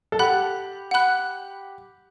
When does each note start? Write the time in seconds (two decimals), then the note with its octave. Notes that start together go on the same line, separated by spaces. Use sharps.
0.12 A4
0.19 G4 F#5 B5 F#6
0.91 F#5 B5 F#6